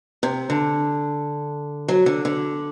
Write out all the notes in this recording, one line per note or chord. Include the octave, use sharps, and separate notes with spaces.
C3
D3
F#3
D3
D3